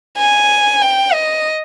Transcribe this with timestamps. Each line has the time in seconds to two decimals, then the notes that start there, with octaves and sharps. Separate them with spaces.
0.17 G#5
0.81 G5
1.13 D#5